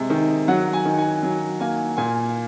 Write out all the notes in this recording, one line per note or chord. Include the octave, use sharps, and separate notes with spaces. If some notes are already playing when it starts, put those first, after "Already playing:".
Already playing: C3 G#3
D#3
F#3 F#5
G#5
D#3
G#5
F#3
A#3 G#5
A#2 G#5